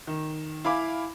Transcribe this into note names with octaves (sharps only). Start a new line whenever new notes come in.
D#3
E4 F5 G#5 B5 D6